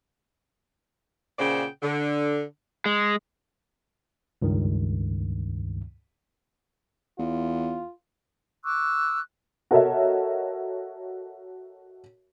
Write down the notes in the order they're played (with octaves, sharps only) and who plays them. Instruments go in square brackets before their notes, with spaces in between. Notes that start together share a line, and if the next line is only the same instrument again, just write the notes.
[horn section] A#2 C#3 C5 D5 F#5 G5
D3
[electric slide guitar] G#3
[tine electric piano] C#2 G2 D#3
[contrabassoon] E2 [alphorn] F4
[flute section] C#6 D6 E6 F#6
[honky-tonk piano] F#4 A4 A#4 C#5 D#5 E5